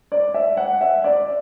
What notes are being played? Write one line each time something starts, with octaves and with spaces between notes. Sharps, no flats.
D5
E5
F#5
E5
D5